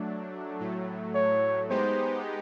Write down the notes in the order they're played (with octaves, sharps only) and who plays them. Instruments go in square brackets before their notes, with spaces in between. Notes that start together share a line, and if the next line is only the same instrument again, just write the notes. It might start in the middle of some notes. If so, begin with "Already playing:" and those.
Already playing: [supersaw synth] F#3 A3 D4
A2 F#3 A3
[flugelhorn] C#5
[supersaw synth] G#3 B3 D#4 G4 [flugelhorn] C5